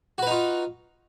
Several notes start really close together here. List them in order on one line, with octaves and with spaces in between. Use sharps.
F#4 B4 D#4 F4